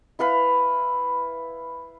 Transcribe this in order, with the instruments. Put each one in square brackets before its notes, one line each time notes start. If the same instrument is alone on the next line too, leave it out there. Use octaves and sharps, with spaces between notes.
[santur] E4 B4 F5 B5